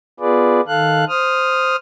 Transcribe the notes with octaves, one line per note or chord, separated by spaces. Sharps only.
B3 F4 G#4 B4 D5
D#3 A4 F5 F#6
C5 D#6 F6